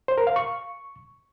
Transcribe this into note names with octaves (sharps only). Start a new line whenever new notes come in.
C5
A#4
F5
C#6